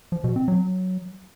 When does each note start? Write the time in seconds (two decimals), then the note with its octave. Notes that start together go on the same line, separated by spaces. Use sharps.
0.12 F3
0.24 B2
0.36 C4
0.48 F#3